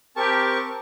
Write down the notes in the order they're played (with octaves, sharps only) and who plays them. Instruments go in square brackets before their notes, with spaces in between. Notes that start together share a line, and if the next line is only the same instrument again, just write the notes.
[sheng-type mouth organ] C4 A#4 C#6 [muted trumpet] G4 [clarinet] A5